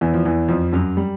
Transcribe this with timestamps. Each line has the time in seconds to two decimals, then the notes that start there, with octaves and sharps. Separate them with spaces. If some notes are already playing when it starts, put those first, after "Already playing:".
0.01 E2 E3
0.14 F3
0.25 E2 E3
0.48 F2 F3
0.72 F#2 F#3
0.97 G3